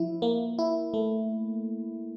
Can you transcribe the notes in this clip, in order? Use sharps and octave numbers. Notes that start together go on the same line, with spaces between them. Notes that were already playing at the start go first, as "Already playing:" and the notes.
Already playing: F3 E4
A#3
E4
A3